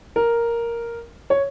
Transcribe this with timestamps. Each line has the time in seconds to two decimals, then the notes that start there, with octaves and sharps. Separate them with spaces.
0.16 A#4
1.30 C#5